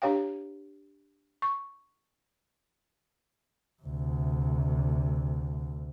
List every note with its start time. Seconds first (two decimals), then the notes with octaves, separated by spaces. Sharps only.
0.02 D4 G4 C#5 F5 G5
1.42 C#6
3.83 D2 C3